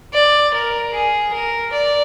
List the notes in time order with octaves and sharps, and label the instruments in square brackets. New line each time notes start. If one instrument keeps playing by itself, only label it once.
[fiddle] D5
A#4
G#4
A#4
D5